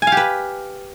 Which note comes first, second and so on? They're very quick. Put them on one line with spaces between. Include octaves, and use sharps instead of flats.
G#5 F5 G4 B4